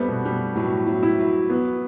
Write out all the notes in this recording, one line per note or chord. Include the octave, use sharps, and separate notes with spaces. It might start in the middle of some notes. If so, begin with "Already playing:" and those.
Already playing: G3 A3 B3 C4
B2
G3
A2 F#3
F#3
E4
F#3
F#3 B3